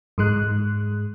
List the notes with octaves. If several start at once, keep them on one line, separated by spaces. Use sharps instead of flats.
G#2 G#3 F#6